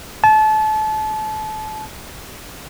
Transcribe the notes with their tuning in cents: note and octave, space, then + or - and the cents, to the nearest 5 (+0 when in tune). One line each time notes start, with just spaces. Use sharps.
A5 -30